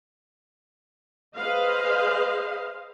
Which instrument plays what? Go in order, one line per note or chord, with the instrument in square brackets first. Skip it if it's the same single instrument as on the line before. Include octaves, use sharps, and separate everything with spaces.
[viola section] G#4 B4 C5 D#5 F5